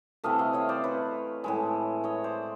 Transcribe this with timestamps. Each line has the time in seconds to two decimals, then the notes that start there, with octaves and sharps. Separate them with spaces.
0.24 C3 E3 A3 D#5 F5
0.39 D#5 F5
0.53 C#5 D#5
0.69 C5 D5
0.84 B4 C#5
1.44 A2 E3 G#3
2.04 C#5 D#5
2.24 C5 D5